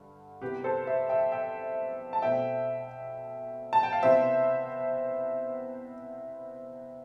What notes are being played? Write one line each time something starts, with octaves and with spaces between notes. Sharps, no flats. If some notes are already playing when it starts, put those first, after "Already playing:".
Already playing: G2 D3
C3 E3 B3 G4 B4
A4 C5
C5 E5
E5 G5
E5 G5
A5
B2 A3 C4 E5 G5
A5
G5
F5
C3 E3 B3 C5 E5